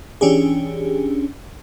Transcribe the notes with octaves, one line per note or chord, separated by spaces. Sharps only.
E3 C#4 D4 G4 G#4